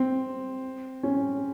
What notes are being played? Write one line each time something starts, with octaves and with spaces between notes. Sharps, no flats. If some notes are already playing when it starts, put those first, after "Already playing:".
Already playing: C4
C#4